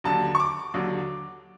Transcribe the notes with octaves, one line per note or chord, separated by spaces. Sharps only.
D#2 D3 F#3 A5
C#6
D6
D#2 D3 F#3